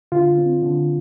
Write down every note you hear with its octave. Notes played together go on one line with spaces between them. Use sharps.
D3 F4
C4
D3